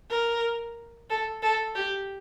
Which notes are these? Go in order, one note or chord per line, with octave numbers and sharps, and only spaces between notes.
A#4
A4
A4
G4